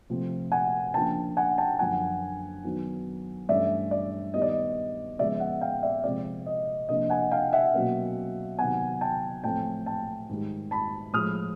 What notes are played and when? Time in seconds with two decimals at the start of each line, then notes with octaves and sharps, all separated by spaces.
0.09 C3 F3 A3 C4
0.52 F#5 G#5
0.94 C#3 F3 A#3 D4 G5 A5
1.37 F#5 G#5
1.58 G5 A5
1.79 F#2 D3 F3 F#5 G#5
2.64 D#3 F#3 B3 D#4
3.49 G2 E3 A3 C#4 D5 E5
3.91 D5
4.34 D#3 G3 B3 D#5
4.42 D5
4.49 D#5
5.19 C#3 F3 G#3 B3 D5 E5
5.40 E5 F#5
5.61 F5 G5
5.83 D5 E5
6.04 C3 F3 G#3 C4 D5
6.46 D#5
6.88 C3 F3 A#3 D4 D#5
7.10 F#5 G#5
7.31 F5 G5
7.53 E5 F#5
7.74 B2 F#3 A#3 C#4
8.59 C3 D#3 F#3 B3 F#5 G#5
9.01 G5 A5
9.44 A2 F3 A3 C4 G5 A5
9.86 G5 A5
10.29 G#2 D#3 G3
10.71 A5 B5
11.13 A2 F3 G#3 D#6 F6